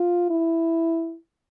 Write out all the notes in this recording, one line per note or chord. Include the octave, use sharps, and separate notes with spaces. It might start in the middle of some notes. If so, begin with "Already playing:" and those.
Already playing: F4
E4